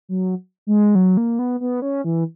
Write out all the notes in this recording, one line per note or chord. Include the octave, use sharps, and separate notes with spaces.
F#3
G#3
F#3
A#3
B3
B3
C#4
E3